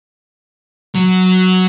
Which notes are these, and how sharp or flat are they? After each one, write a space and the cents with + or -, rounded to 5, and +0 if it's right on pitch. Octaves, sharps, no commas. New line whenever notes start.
F#3 +0